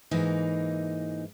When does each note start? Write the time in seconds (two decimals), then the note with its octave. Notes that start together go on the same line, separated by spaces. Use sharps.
0.11 G#2 E3 A#3 D#4